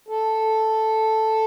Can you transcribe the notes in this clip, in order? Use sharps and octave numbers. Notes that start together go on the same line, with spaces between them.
A4